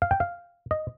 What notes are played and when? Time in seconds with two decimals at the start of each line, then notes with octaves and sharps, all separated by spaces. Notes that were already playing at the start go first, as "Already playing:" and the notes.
0.02 F5
0.11 G5
0.20 F5
0.71 D#5